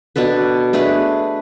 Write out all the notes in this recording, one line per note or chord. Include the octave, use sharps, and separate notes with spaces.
B2 D4 A4 B4
A3 D4 G#4 B4